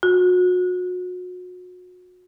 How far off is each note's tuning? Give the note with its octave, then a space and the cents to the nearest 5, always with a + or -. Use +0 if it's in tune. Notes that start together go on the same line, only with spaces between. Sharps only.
F#4 -35